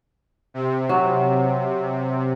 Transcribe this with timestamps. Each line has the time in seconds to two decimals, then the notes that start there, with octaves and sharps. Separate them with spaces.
0.54 C3
0.89 F#3